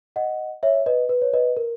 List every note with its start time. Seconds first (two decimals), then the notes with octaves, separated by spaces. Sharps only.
0.16 D#5 F#5
0.63 C#5 E5
0.86 B4 D#5
1.09 B4
1.22 C#5
1.33 B4 D#5
1.57 A#4